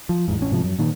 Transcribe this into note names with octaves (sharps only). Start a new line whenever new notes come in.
F3
E2 G#2
A1 C#4
G#2 C3 F3
F#2
A#2 D#3